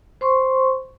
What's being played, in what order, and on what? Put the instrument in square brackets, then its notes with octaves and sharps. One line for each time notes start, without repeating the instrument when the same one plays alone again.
[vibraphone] C5 C6 C#6